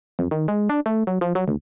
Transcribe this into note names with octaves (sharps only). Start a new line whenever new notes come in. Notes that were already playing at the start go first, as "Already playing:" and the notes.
F2
D#3
G#3
D4
A3
F#3
F3
F#3
D2